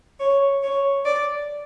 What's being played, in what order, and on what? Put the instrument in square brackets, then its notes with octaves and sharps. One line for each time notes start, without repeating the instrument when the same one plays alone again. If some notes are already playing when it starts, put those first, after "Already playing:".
[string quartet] C#5
C#5
D5